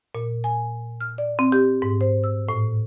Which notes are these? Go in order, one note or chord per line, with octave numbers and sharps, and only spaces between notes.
A#2
G#5
F6
D5
C4
G4
G#2
C5
E6
A2